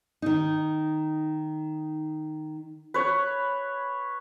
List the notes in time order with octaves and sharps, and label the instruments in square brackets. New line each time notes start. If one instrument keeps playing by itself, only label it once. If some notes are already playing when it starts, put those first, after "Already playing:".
[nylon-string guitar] D#3 D#4
[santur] B4 C#5